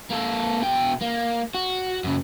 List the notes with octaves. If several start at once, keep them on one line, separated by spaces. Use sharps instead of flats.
A#3 A4
B2 G5
A#3
F#4
F#2 C#3